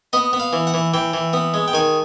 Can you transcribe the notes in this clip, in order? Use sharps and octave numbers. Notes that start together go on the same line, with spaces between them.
B3 D#5
B3
F5
E3
F#5
E3
E3 G5
E3
B3
G#3
G5
D#3 G#5